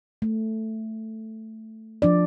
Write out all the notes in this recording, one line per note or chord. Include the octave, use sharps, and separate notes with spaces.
A3
F3 D4 D5